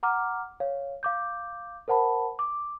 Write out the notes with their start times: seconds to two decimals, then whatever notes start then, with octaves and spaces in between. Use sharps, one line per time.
0.03 F#5 A#5 D6 F6
0.60 C#5 F5
1.03 F5 D6 G6
1.88 A#4 C5 F#5 A5 B5
2.39 D6